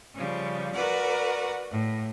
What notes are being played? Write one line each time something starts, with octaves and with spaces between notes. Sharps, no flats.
C#3 F3 G3
F#4 A#4 B4 D5 F#5
A2